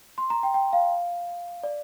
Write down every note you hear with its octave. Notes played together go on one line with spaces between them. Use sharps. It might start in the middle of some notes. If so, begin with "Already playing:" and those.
C6
A#5
G5
G5
F5
D5